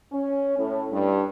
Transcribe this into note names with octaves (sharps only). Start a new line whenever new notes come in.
C#4
A2
G2